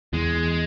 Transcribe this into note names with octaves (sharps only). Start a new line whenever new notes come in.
E2 G#3